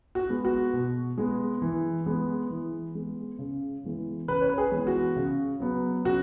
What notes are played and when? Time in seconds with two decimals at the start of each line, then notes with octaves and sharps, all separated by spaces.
0.15 F#4
0.29 G#3 B3
0.45 F#4
0.73 B2
1.18 G#3 B3
1.62 E3
2.06 G#3 B3
2.50 E3
2.95 G#3 B3
3.39 C#3
3.84 E3 G#3 B3
4.28 C#3 B4
4.41 C#5
4.49 B4
4.58 G#4
4.72 E3 G#3 B3
4.87 F#4
5.16 C#3
5.60 F#3 B3
6.05 C#3 F#4